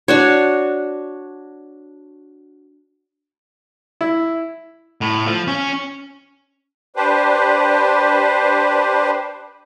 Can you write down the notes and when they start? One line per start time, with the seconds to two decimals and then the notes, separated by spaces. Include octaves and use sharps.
0.08 D4 F#4 C#5
4.01 E4
5.01 A2
5.26 F3
5.48 C#4
6.96 D4 G4 B4 C5